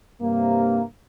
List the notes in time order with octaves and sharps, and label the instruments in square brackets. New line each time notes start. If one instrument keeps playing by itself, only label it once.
[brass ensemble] G2 C3 A#3